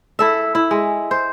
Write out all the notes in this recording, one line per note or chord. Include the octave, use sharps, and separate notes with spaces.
E4 A4 E5
E4
G#3
C5